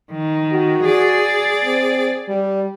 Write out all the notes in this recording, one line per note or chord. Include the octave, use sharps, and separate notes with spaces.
D#3
F#4
G#4 D5
C4
G3